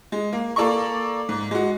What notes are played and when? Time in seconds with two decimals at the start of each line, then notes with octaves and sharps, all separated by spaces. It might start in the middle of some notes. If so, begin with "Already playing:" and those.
0.12 G#3
0.33 A#3
0.56 A#3 A4 D5 A#5 C#6
1.29 G#2
1.51 G#3 F#4